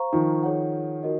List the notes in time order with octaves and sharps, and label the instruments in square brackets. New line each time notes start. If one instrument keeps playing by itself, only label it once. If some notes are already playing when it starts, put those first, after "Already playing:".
Already playing: [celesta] C5 F5 A#5 C#6
[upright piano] D#3 F3
[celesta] G#4 C#5 F#5
D#4 F#4 A#4 D#5